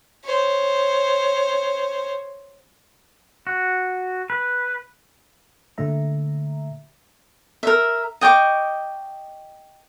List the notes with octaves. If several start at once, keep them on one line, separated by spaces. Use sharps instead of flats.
C5 C#5
F#4
B4
A#2 D3 A3 E5 A#5
A#4 E5
D#5 G5 C#6 D6